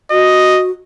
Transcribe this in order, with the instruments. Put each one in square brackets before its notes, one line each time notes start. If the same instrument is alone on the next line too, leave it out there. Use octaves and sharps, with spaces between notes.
[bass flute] F#4 [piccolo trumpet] D#5